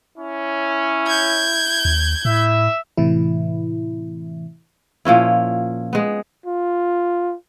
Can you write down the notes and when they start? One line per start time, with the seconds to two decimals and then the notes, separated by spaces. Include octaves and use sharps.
0.18 C#4 E4
1.07 G6 G#6
1.85 D#2
2.25 A2 E4 E5
2.97 A2 C3 E3 E4
5.05 A#2 F3 C#4 E4
5.93 G#3 B3
6.46 F4